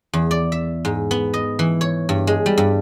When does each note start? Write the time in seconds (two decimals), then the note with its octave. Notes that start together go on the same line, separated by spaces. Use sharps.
0.13 E2
0.31 D5
0.52 E5
0.85 G#2
1.11 B3
1.34 D#5
1.59 E3
1.81 C#5
2.09 G2
2.27 G#3
2.46 G3
2.58 G2